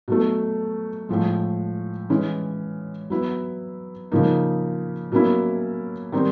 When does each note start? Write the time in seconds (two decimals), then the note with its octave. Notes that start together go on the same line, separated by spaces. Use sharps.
0.08 B2 F#3 A3
1.09 A2 F3 G#3
2.10 E3 G#3 C#4
3.10 F#3 B3 E4
4.12 C#3 F3 A#3 D#4
5.12 B2 F#3 A#3 C#4 E4
6.12 D#3 G3 C4 D#4